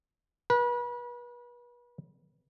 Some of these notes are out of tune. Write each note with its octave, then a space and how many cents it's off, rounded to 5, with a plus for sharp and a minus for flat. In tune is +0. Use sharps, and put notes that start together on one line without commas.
B4 -35